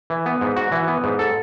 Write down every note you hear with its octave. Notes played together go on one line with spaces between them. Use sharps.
E3
B3
G#2
F#4
E3
B3
G#2
A4